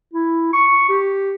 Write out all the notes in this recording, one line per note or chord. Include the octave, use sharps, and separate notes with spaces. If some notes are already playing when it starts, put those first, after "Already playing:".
E4
C#6
G4